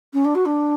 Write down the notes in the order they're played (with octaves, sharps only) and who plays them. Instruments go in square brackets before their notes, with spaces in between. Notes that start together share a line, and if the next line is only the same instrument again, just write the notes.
[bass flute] C#4
D4
F#4
D4